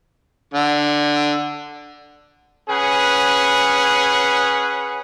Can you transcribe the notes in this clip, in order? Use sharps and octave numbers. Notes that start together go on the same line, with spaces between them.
D3
C#4 G#4 B4 F#5